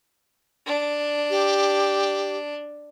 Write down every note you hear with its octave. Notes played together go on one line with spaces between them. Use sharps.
D4
G4